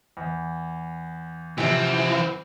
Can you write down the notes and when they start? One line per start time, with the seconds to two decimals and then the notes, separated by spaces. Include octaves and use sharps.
0.17 E2
1.58 F#2 C3 E3 F3 C4